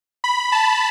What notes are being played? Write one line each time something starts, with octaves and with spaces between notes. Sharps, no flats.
B5
A5